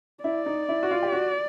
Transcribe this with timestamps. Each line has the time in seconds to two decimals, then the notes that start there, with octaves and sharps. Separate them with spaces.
0.24 E4 D5
0.46 D#4
0.69 E4
0.83 F#4
0.91 F4
1.03 G4
1.12 F#4